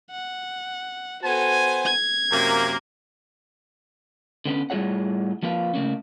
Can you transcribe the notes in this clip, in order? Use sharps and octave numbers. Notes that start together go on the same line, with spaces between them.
F#5
B3 F#4 A4 C5 G#5
G#6
F#2 C3 A#3
D3 B3 C#4 B4
A2 G3 F4 G#4 C#5 F#5
F3 A#3 F4 B4 F5
C#3 A3 A#3 C#4